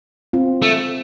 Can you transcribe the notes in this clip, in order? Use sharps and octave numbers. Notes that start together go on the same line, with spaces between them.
C4 F4
A3